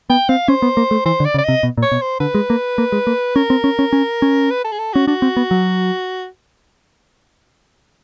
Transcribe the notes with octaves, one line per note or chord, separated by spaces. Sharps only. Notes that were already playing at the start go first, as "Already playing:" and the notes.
B3 G5
C4 F5
C#4 C5
B3
A#3
A3
E3 C5
D3
D5
C#3
D5
C3 D#5
B2
A#2
C#5
B2
C5
D3 B4
G#3
A#3
A#3
G#3
A#3
C#4 A#4
C4
C#4
C#4
C#4
C#4
B4
A4
G#4
A4
C#4 F#4
D4 F#4
C4
B3
F#3